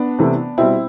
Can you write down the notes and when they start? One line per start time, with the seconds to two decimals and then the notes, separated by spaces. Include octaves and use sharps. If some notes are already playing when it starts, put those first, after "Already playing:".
Already playing: B3 D4
0.19 C3 E3 A3
0.58 B2 G3 C4 E4